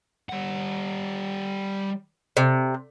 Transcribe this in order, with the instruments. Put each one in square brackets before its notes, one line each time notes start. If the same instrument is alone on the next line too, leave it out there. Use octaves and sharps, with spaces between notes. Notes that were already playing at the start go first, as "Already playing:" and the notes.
[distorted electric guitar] G3 F#5
[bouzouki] C3